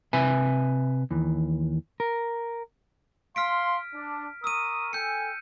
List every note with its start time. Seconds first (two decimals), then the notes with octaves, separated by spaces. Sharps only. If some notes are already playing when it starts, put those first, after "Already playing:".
0.13 C3 B4 E5 G#5
1.11 D#2 E3
2.00 A#4
3.36 F5 C6 F6 B6 D7
3.94 D4
4.44 A#4 C#6 D#6 E6 D#7
4.93 A4 G5 G#5 G6 C#7